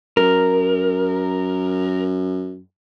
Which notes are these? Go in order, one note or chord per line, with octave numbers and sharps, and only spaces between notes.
F#2 A#4